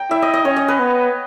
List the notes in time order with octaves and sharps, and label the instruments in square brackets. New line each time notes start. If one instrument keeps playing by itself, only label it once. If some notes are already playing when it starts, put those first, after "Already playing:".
Already playing: [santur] G5 A#5
[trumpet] E4 [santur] E5
[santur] D#5
D#5
[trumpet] C#4 [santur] C#5
[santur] D#5
B4
[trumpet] B3